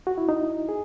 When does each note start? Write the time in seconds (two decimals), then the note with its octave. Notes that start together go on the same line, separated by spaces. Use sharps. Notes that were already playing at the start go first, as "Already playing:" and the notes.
0.07 F#4
0.18 E4
0.29 D#4
0.69 G#4